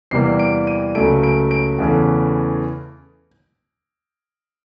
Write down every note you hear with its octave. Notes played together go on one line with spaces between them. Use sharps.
E2 C3 E3 G3 A#3 C7
D7
D#7
C#2 C#3 F#3 A3 D7
D7
D7
E2 C#3 E3 A3